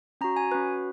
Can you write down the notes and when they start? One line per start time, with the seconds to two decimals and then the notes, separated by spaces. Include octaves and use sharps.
0.21 C#4 A#5
0.24 F#4
0.36 G#5
0.51 C#4 F#4 B4